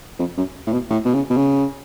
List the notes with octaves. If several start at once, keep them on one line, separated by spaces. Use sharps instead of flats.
F2
F#2
A2
B2
A2
B2
C#3
B2
C#3